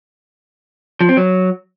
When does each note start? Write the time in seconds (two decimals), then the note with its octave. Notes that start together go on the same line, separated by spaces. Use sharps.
1.01 F3
1.09 C4
1.17 F#3